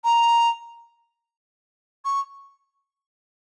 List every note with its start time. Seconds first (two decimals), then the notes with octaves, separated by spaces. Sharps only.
0.04 A#5
2.05 C#6